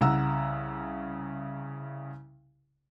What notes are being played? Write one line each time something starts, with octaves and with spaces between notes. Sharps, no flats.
C2 C#3 F#5 A#5 E6